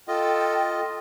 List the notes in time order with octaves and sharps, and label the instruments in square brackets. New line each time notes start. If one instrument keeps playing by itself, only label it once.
[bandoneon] F4 D#5 [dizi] A4 [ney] G5